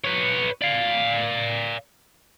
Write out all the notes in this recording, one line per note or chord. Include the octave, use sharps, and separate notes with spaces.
B4 C#5
D5 F5